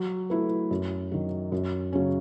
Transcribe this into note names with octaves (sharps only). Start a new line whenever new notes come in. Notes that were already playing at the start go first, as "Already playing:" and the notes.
Already playing: F#3
A3 E4 B4
F#2
D#3 F#3
F#2
C#3 F#3 C#4